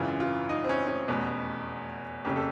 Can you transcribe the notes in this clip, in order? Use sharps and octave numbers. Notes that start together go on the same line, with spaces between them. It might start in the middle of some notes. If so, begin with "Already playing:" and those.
Already playing: G#1 F#2 C#3 E3 F4
F4
D#4
C4
C#4
C#4
F1 E2 B2
F#1 F2 C#3 G4
A4